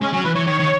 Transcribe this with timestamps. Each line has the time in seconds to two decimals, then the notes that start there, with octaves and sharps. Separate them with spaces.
0.01 G#3 C#4
0.13 F#3 C#4
0.24 E3 B4
0.35 E3 C#5
0.47 D#3 C#5
0.60 D#3